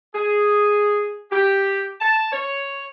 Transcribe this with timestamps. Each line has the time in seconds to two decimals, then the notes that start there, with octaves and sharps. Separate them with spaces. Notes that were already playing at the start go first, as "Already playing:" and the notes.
0.15 G#4
1.32 G4
2.01 A5
2.33 C#5